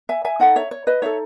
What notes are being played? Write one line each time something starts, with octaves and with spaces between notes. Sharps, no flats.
E5 G#5
E5 G#5
D#4 A4 D#5 F#5
C#5 E5
C#5
B4 D#5
D#4 A4 C#5 E5